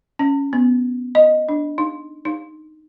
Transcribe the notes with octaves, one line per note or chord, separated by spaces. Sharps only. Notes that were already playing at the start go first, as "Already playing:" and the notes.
C#4
B3
D#5
D4
D#4
D#4